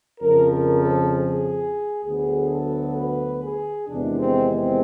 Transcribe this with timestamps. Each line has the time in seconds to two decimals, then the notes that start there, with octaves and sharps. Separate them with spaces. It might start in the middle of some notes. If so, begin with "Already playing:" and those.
0.20 F2 C#3 F3 A#4
0.50 A#4
0.82 A4
1.13 G#4
2.03 D2 D3 F#3 B3 G#4
2.50 A4
2.96 B4
3.43 G#4
3.88 E2 C3 D#3 G#3 D4
4.19 C4
4.50 C4